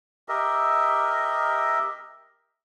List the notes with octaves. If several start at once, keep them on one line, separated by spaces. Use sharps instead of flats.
G4 A#4 D#5 E5